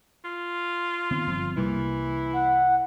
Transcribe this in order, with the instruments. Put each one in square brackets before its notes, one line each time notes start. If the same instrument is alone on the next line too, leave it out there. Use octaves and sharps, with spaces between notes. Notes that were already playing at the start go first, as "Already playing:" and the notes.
[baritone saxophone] F4
[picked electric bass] D#3 B3 C4
G1 F3 C4
[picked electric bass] C2 G3 A#3 [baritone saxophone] E3 [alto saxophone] E4
[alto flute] F#5